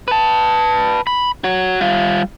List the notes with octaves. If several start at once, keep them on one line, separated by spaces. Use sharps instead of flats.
B4 A5
B5
F#4 C#5
G3 F4